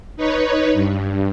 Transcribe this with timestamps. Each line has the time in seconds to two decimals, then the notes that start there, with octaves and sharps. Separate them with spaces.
0.17 D#4 B4 C#5
0.73 G2